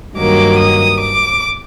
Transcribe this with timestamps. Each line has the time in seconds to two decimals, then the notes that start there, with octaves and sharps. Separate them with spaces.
0.17 G2 D#3 F#3 A#3 D6
0.58 D#6
0.99 D6